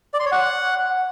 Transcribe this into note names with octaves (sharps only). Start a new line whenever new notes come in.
D5
C6
C#5
F#5